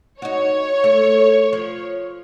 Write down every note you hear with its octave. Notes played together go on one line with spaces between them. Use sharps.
D#4 F#4 C#5
A3
F3